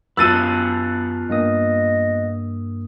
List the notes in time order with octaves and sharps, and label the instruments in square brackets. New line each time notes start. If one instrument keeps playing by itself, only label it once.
[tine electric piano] F#2 A5 [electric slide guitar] B3 F4 B4 [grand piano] E6 A6 D#7
[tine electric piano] G2 A#3 D#6 [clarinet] D#5